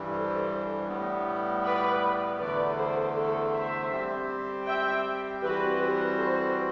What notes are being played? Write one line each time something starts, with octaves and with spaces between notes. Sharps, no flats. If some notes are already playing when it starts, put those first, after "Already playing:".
Already playing: G2 E3 G3
A4 C5
A2 G3 B3
B4 D5
E2 D3 A3 B4 D5
A4 C5
A4 C5
C5 E5
G3 C4 G4 C5
E5 G5
E3 G3 C4 F#4 G4 B4
G4 B4
A4 C5